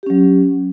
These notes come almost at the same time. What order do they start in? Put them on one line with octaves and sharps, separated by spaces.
G4 C#4 F#3